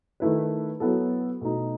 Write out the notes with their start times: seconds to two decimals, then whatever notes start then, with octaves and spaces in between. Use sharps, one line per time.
0.20 D#3 A3 E4 B4
0.80 F#3 B3 E4 A4
1.41 B2 A3 D#4